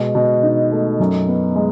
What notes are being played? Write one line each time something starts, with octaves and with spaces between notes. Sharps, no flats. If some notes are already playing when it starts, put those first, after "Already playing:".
Already playing: B2 G#3
B2
D#4
A3
F#2
B3
G#3